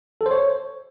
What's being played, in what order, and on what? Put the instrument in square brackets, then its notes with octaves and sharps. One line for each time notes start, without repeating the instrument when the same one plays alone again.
[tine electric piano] A4
C5
C#5